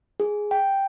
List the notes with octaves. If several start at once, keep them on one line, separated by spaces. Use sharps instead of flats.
G#4
G5